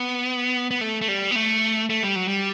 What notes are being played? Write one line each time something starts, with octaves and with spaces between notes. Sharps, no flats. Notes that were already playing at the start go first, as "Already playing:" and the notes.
Already playing: B3
B3
A3
A3
G3
B3
A3
A3
G3
F#3
G3